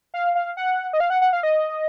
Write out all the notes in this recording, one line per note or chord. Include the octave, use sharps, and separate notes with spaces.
F5
F5
F#5
D#5
F5
F#5
F#5
F5
D#5